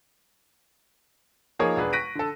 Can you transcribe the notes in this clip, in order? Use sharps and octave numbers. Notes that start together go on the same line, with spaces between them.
F3 A#3 D#4 G#4 A#4 C#5
E1 D4 G#4 B4
C#6 F#6 A#6 B6 D7 D#7
D3 A4